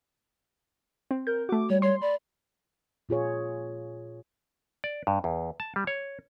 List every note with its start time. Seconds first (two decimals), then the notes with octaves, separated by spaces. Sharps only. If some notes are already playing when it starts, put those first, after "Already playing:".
1.11 C4
1.27 A#4 G6
1.49 A3 F#4 D6
1.70 G3 C#5
1.82 C#5 C6
2.01 D5 B5
3.09 A#2 F4 G#4 C#5
4.84 D5
5.07 G2
5.24 E2
5.60 A5
5.76 G3
5.87 C#5